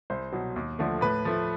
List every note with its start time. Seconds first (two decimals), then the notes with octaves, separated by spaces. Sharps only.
0.10 C2 C5
0.32 B2 F#3
0.56 D#2
0.79 D3 F3 A3
1.01 A2 B4
1.25 F3 A3